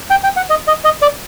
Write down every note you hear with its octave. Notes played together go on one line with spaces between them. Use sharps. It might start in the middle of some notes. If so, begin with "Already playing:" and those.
G5
G5
F#5
D#5
D#5
D#5
D5